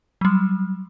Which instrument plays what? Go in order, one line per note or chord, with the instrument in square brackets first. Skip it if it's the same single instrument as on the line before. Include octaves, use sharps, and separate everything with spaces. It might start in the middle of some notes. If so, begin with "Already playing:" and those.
[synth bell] F#3 G3